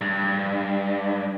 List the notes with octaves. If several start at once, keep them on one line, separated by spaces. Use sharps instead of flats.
G2